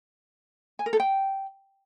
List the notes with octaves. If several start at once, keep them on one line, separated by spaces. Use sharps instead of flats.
G#5
A#4
A4
G5